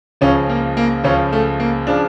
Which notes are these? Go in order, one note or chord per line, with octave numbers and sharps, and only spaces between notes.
C#2 C#3 F3 C#4
A#3
A#3
C#2 C#3 F3 C#4
A3
A#3
C#3 F3 D4